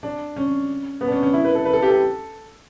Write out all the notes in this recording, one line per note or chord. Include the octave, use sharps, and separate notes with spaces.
D4
C#4
B3
D4
C#4
C#4
E4
B4
A4
B4
A4
G4
A4